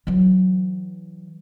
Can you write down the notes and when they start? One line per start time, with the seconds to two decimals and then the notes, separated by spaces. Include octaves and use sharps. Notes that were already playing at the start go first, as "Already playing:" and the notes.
0.07 E3 F#3